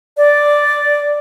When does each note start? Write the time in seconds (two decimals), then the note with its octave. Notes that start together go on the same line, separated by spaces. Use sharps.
0.17 D5